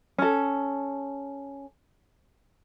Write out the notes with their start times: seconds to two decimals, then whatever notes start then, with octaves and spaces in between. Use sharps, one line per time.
0.18 C#4 A4